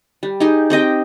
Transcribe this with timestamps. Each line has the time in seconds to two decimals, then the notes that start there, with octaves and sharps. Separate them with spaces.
0.23 G3
0.40 D#4 G4 G#4
0.70 C4 G4 D#5 G5